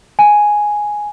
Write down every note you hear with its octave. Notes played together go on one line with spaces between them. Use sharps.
G#5